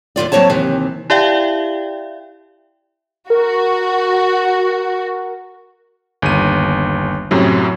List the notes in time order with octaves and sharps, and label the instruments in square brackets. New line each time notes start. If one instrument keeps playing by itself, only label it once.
[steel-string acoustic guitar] D#2 D#3 F4 D5
F#3 A3 A#3 C4 C#5 A5
D#2 C3 E3
[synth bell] E4 G4 D5 E5 F5 G5
[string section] F#4 [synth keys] A#4
[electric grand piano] G1 D#2 D#7
F#2 A2 C3 F#3